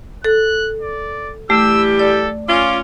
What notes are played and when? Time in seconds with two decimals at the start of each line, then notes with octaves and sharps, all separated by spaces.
0.24 A4 F#6
0.82 D5
1.50 E3 G3 A3 G4 E6
1.99 A4 D5
2.48 C#4 F4 D6